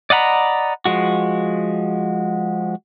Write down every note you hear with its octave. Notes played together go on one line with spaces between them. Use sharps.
D5 D#5 F#5 A#5 B5
F3 G#3 F#4